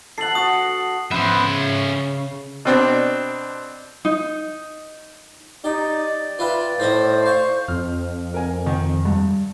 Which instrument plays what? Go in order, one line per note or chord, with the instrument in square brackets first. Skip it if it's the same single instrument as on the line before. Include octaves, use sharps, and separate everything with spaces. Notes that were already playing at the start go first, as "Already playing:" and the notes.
[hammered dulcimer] A4 F#5 [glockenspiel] C7 F#7
[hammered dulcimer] F#4 [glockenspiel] D#6
[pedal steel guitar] B3 B4 C5 [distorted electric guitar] C#4 E5
[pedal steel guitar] C#3
[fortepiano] B2 C4 D4
[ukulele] D#4
[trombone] D#4 [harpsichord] G4 [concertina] D5
[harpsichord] F4 E5 G5 [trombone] B4
[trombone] A2 [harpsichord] D#4 D#5 E5 [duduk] C5
[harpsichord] F5 C#6
[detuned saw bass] F2 [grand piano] F6
[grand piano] A#4 G#5
D#3
G2